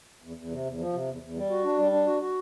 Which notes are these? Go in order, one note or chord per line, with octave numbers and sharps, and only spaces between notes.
E2
E2
C3
E2
F3
C3
E2
E2
G3
F#4
D4
G3
D4
F#4
F#4